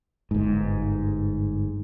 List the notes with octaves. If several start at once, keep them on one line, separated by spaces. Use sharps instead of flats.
G1 G#2